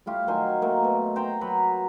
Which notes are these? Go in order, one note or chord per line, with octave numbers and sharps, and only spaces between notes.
G3 A3 F4 G4
D#3 F#3 C5 G#5
A3 A#3
B2
C5 G5 A#5
F#3 B4 A#5 B5